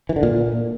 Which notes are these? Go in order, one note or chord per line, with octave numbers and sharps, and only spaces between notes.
E3
D3
A#2